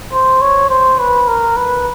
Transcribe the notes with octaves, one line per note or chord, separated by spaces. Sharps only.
C5
C#5
C5
B4
A#4
B4